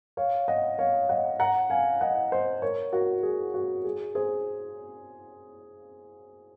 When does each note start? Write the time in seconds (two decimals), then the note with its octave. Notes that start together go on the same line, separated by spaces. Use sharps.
0.17 C#5 F5
0.48 D#5 F#5
0.78 C#5 F5
1.09 D#5 F#5
1.39 F#5 A#5
1.70 F5 G#5
2.01 D#5 F#5
2.32 C5 D#5
2.62 A#4 C#5
2.93 F#4 A#4
3.23 G#4
3.54 F#4
3.85 G#4
4.15 G#4 C5